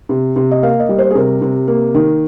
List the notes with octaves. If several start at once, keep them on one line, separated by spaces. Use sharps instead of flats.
C3
C3
D#5
A#3 F5
D#5
G3
C5
G#4
C3 A#4
C3
A#3
D#3